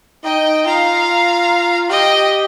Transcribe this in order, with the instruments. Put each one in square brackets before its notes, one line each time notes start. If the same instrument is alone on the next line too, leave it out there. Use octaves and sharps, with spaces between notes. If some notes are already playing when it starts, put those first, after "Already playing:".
[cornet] D#4 [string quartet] D#5 G5
[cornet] F4 [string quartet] F5 A#5
[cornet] G4 [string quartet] D#5 G5